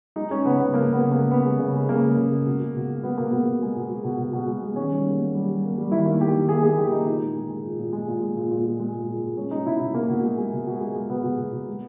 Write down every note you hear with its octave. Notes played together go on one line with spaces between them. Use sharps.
G#3 D#4
G#3 C#4
C#3 B3
C#3 B3
G#3 A#3
G#3 B3
C#3
A#3
G#3
G#3 B3
G#3
C#3
G#3
C#3 A#3
G#3
C#3
G#3
B2
G#3
B2
B2
G#3 B3
B2 A#3
B2 B3
B2
G#3
B2
G#3
B2
B2
B2
G#3
G#3
D#3 C#4
G3
A#3
A#3
G3
G3
A#3
G3
D#3 E4
A#3
A#3 G4
D#3
A#3 G#4
A#3 G#4
D#3 G4
A#3 D#4
A#2 D#4
G#3
G#3
G#3
A#2
A#2
G#3
A#2
G#3
A#2
A#2
G#3
G#3
A#2
A#2
A#2
G#3 C#4
G#3 D#4
B2 E4
B2 E4
B2 A#3
B2
G#3
G#3
B2
B2
G#3
G#3
B2 B3
B2
B2
B2
G#3